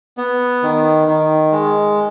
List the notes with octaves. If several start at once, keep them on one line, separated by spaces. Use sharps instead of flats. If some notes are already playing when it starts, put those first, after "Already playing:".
B3
D#3
D#3
G#3